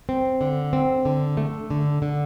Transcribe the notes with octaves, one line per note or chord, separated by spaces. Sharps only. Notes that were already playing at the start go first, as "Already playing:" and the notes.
C4
D3
C4
D3
A3
D3
D3